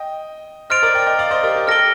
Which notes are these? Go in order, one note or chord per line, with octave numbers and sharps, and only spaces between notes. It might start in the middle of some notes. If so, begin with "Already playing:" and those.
Already playing: D#5 G5
C5 D#5 F6 A6 D7 F7
A#4 D5
D#5 G5
D#5 G5
D5 F5
C5 D#5
G4 A#4
G4
A4 F6 A#6 D7 G7